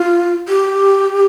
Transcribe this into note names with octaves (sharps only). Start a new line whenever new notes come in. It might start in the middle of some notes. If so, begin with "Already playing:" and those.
Already playing: F4
G4